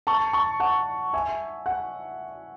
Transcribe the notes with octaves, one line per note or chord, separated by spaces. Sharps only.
A5 C#6
A5 C#6
F#5 A5
E5 G#5
F#5